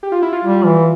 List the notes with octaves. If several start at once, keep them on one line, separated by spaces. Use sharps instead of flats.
G4
F4
E4
F4
G3
E3